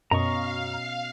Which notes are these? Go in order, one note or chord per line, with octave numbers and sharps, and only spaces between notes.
F#2 B2 C#4 D#5 F5 A#5 C#6